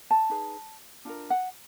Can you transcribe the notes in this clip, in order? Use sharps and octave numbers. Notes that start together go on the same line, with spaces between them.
A5
D#4 G#4 B4
D4 F4 A#4
F#5